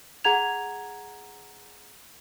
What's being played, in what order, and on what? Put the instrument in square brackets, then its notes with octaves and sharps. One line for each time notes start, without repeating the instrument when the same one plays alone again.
[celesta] G#4 F#5 A#5 G#6 F7